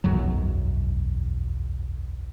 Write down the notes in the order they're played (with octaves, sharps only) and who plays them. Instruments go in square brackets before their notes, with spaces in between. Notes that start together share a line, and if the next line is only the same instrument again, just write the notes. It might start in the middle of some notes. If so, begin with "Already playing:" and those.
[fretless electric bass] E1 B1 F#2 F#3